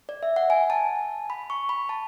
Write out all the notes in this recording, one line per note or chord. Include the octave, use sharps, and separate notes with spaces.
D5
E5
F#5
G#5
A5
B5
C#6
B5
A5